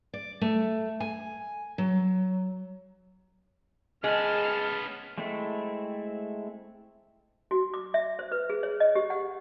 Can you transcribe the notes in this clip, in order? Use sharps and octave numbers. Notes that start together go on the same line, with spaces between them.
D5
A3
G#5
F#3
G#3 B3 C#4 A5 F6
G#3 A3 C4 E4 A4
F#4
D6
E5
C5
B4
G#4
C#5
D#5
G4
F#5